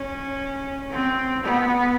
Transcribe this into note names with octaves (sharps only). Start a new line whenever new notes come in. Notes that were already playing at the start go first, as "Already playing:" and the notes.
Already playing: C#4
C4
B3